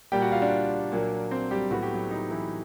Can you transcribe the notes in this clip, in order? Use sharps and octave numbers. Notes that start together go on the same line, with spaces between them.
A#2 G3 A#3 G4 G5
F#4 F#5
F4 F5
D4 D5
A#2 F#3 A#3
C4 C5
G3 G4
A2 F#3 B3 F#4
G4
F#3 F#4
D#4
E3 E4